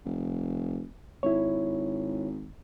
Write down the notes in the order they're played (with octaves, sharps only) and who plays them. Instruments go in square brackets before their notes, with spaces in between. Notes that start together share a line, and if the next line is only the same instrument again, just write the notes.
[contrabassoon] F1
[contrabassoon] G#1 [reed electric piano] E4 C#5